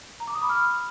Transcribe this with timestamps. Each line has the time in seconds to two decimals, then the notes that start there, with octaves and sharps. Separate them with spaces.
0.20 A#5
0.27 D6
0.35 D#6
0.42 B5
0.49 F6